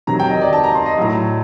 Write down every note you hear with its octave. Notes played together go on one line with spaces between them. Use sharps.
C3 D#3 F#3 A#5
G5
D#5
D5
A5
A#5
C6
D#5
A2 F#3